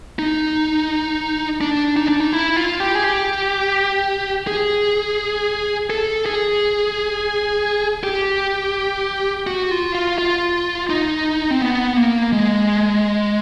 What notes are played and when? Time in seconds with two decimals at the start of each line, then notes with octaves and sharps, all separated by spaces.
0.19 D#4
1.61 D4
1.97 D#4
2.08 D4
2.20 D#4
2.33 E4
2.56 F4
2.80 G4
2.95 G#4
3.04 G4
4.47 G#4
5.90 A4
6.26 G#4
8.04 G4
9.47 F#4
9.71 F4
9.95 F4
10.19 F4
10.90 D#4
11.51 C4
11.61 B3
11.97 A#3
12.33 G#3